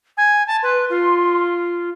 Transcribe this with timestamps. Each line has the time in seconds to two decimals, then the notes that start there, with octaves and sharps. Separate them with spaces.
0.17 G#5
0.47 A5
0.63 B4 C6
0.90 F4